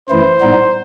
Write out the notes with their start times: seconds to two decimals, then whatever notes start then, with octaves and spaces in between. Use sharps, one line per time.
0.09 F#2 E3 A3 E4 C5
0.41 A2 G3 B3 D#4